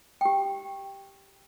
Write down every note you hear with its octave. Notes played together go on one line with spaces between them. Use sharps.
G4 G5